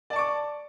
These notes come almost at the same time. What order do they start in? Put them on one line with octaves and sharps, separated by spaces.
D5 A5 C#6 D6